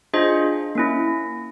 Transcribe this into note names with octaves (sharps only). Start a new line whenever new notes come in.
D4 F4 G#4 C5 D#5
A#3 C#4 E4